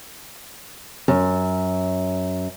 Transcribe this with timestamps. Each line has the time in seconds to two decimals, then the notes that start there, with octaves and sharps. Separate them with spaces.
1.08 F#2